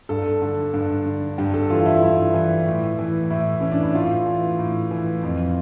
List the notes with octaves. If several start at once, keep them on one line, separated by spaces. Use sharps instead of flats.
G2 A4
D3
G2
D3
G2 G4
A4
E3 F4
E4
G2 E4
E3
A2
E3
A2 E4
E3 C#4
D4
E4
A2 F4
E3
A2
E3
F2